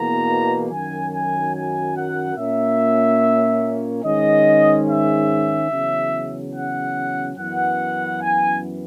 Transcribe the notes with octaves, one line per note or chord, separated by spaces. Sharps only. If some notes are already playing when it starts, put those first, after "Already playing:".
Already playing: E2 B2 A#3 A#5
F#2 D#3 F#3 G#5
G#5
G#5
F#5
A#2 A#3 C#4 E5
G#2 D#3 G#3 C#4 D#5
E5
E2 C#3 F#3 C#4
F#5
F#2 E3 B3 F#5
G#5